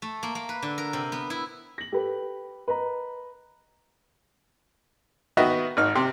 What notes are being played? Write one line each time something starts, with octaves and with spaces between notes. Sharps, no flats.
A3
A#3
A#3
B4
D3
A#4
C3
B3
E4
A#6 F#7
G4 A4 B4
B4 D#5 A#5
D#3 B3 F#4 D#5 E5
G#1 D#4 F6
C3 C4